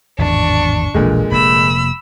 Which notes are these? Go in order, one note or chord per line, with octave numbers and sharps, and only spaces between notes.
G#1 E2 A2 D4 C#6
E1 A#1 A#2 D3 E3 G#3
F1 A#3 B5 E6